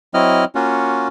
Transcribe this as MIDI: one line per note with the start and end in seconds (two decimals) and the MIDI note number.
0.14 0.45 54
0.14 0.45 60
0.14 0.45 64
0.14 0.45 75
0.14 0.45 89
0.55 1.08 58
0.55 1.08 61
0.55 1.08 65
0.55 1.08 66